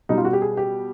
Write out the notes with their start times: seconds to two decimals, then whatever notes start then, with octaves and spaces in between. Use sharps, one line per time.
0.09 B2 G3 D#4
0.17 F4
0.25 F#4
0.33 G4
0.42 G#4
0.57 G4